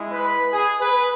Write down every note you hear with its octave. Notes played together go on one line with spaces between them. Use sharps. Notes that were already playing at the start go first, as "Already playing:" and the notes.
Already playing: G#3 E4
B4
G#4
B4